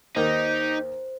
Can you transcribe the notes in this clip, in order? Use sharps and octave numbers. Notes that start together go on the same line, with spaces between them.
D#2 D#3 D#4 G4 C5